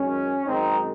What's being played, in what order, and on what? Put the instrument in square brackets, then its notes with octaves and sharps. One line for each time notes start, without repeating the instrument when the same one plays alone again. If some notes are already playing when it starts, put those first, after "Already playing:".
Already playing: [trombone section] F#2 D#3 G#3 C#4
F#2 D#3 G#3 C4 D#4